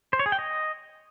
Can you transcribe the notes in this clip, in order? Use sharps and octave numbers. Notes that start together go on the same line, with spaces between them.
C5
C#5
G#4
G5
D#5